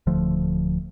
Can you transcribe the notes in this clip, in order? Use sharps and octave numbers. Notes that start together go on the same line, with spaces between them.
D1 D3 F3 A3